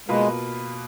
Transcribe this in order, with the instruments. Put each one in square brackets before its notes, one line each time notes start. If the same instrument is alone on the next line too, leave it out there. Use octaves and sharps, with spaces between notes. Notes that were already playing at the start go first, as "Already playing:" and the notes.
[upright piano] B2 A#3 F4 B4 [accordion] G#3